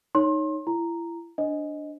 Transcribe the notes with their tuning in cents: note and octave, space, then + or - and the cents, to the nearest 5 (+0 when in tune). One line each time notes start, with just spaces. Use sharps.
D#4 +0 C#5 +0 C6 +30
E4 +35 A#5 -5
D4 +0 C5 +25 D#5 +0